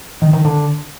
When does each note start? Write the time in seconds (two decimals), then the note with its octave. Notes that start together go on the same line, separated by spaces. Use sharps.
0.22 D#3
0.33 D#3
0.45 D3